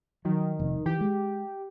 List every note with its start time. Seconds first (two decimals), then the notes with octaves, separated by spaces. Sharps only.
0.25 D#3 F#3
0.59 F1
0.86 E3 G4
1.01 G#3